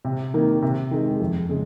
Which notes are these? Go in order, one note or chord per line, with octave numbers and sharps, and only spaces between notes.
C3
D#3 A#3
C3
D#3 G#3
F2
C#3 G#3